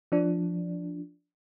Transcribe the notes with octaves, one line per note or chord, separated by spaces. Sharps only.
F3 D4